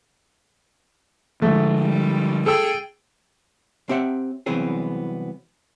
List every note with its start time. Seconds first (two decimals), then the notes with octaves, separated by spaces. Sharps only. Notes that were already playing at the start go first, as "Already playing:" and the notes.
1.42 G#2 D3 F3 A3
1.80 G3
2.46 G#4 A4 G5 E6
3.89 C4 G4 E5 F#5
4.46 C2 E3 F#3 B3 C4 G#4